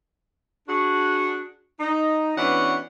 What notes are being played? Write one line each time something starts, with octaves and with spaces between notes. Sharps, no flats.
D4 F#4 G#4
D#4
E3 B3 C#4 D4 F#4 F#5